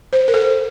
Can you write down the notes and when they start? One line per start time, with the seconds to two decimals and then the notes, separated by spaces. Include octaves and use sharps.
0.13 C5
0.28 A#4
0.34 A4